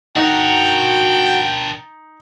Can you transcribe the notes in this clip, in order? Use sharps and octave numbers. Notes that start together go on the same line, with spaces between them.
D4 D#4 F#4 A#4 G5